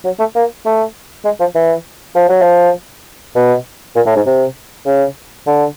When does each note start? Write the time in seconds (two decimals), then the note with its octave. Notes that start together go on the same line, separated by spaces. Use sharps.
0.04 F#3
0.19 A3
0.35 A#3
0.65 A3
1.25 G#3
1.40 F3
1.55 E3
2.15 F3
2.29 F#3
2.42 F3
3.35 B2
3.96 A#2
4.06 A2
4.16 G#2
4.26 C3
4.86 C#3
5.47 D3